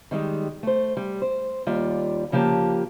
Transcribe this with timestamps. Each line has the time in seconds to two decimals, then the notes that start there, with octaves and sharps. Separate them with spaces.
0.11 D#3 G3 G#3
0.63 A3 C5
0.97 G3
1.22 C5
1.67 D#2 G3 F4 D5
2.32 C#3 F3 A#3 G4 A5